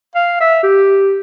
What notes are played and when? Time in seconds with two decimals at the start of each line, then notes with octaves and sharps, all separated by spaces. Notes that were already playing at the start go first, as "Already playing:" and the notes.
0.15 F5
0.41 E5
0.63 G4